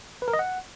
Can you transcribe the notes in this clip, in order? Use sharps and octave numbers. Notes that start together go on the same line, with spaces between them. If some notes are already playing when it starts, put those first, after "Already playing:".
B4
A#4
D#5
F#5